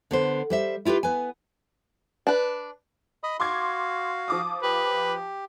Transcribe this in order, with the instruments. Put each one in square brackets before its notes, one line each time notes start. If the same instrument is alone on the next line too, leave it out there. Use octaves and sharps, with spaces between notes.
[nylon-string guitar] D3 B3 C5
G3 C5 E5
E4 F4 G4 A4 B4
B3 B4 G#5
[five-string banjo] D4 B4
[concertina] D#5 B5 D#6
[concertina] F#4 F5 [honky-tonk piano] C6 D6 G#6
[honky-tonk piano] F3 D6 D#6
[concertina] G4 [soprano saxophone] B4